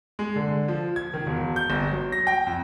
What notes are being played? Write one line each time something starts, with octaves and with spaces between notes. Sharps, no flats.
G#3
D3
F3
G#6
D#3
E1
G6
G1
F#3
A#6
G5
F2